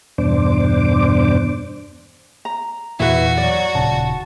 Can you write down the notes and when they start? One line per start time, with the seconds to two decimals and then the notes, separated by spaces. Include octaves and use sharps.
0.18 E2 G2 B2 D4 C5 D6
2.45 A#5
3.00 E2 A#2 E3 E4 F#4 B4
3.37 F#3 D5
3.75 D#1 A#2 C#3 A5